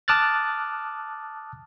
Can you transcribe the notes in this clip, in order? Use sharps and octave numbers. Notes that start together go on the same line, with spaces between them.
A5 D6 D#6 F6 F#6 A6